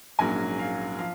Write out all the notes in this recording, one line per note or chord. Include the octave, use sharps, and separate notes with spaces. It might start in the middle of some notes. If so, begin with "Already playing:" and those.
A#1 G#2 F#3 A#3 C#4 G#5
F5
F3 F5